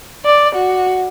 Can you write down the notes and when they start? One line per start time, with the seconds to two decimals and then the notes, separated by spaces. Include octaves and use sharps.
0.25 D5
0.55 F#4